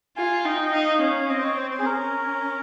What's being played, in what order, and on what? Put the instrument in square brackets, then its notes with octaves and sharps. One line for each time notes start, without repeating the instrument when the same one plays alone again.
[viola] F4 [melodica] G#5
[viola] D#4 [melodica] G5
[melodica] D#5
[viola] D#4 [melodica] F5
[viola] C#4
[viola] C4 [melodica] D#5
[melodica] C5
C#5
C5
C5
G#4
[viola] C#4 [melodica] A#4